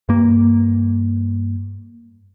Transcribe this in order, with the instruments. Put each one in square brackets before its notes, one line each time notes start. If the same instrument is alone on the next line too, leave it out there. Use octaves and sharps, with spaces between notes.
[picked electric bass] G2 A#3